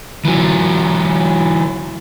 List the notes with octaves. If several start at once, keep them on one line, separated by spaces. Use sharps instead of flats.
E3 F#3